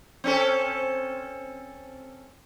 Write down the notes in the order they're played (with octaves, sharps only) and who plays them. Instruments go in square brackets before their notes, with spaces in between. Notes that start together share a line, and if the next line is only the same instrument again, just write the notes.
[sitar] C4 C#4 A4